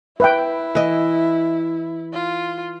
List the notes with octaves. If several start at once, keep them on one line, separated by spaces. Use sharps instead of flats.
E4 B4 E5 G5
E3 D#5
F4